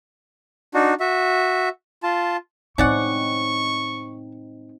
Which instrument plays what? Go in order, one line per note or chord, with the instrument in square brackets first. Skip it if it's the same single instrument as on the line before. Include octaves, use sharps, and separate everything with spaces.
[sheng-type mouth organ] D4 D#4 F#4
F#4 E5
F4 A5
[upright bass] A2 G#3 [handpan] C4 D#4 [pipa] C#4 D5 F#5 [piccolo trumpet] C#6